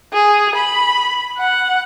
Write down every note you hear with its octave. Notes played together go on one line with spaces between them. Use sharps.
G#4
B5
F#5